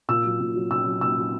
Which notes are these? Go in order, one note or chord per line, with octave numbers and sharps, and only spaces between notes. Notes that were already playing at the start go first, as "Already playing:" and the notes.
A#2 E6
F#3
A#2
F#3
A#2 E6
F#3
A#2 E6
F#3